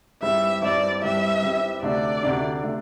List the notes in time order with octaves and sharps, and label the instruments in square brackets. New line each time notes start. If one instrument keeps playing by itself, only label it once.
[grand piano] G2 G3 C4 E4 [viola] E5
[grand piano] G2 G3 C4 E4 [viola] D5
[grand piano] G2 G3 C4 E4 [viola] E5
[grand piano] G2 G3 C4 E4
[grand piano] D2 C3 A3 D4 [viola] D5
[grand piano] D2 C3 A3 D4
C3 A3 D4